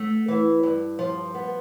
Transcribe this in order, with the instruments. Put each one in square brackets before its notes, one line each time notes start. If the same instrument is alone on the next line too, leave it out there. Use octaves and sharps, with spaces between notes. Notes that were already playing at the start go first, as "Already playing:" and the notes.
Already playing: [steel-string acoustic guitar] A3
E3
G2
F3
B3